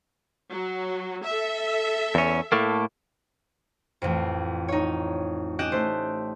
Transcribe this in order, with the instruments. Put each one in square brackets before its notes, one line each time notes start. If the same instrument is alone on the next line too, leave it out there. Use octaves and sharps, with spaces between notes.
[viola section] F#3
A4 E5
[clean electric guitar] E2 C#4
A2 A3 A#3
[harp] A1 F2
D#4 C#5
C#4 G4 D#5 F#6 G6 E7
A3 C5